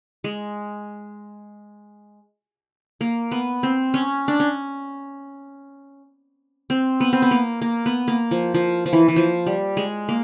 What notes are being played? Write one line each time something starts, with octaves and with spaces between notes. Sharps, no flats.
G#3
A#3
B3
C4
C#4
D4
C#4
C4
B3
C4
B3
A#3
A#3
B3
A#3
F3
F3
F3
E3
E3
F3
G3
G#3
A#3